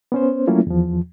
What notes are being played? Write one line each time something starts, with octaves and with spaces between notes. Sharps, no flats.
B3 C#4 C5
F#3 A3 A#3 C#4 E4 F4
E2 F3